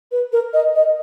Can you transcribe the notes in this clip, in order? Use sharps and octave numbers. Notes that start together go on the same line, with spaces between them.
B4
A#4
D#5
D#5